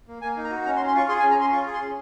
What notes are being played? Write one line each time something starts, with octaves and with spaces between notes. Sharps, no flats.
A#3
A#3 G#5
D#4
A#5
F#4
C#4 A#5
C6
C#4
C6
F4 C#6
G#4 C6
G#5
C#4
A#5
C#4 C6
F4 C#6
G#4
C6
C#4